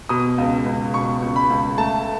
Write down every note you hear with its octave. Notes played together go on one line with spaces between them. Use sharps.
B2 D#6
C#2
C#2
B2 C#6
C#2
B5
C#2
A3 A5